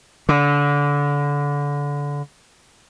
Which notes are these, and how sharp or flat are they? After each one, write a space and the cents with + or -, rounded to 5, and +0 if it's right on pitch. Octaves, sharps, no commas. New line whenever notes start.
D3 -25